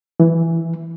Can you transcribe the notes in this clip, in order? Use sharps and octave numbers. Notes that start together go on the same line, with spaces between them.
E3